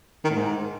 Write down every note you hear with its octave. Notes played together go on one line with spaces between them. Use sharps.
D#3
A2
G#2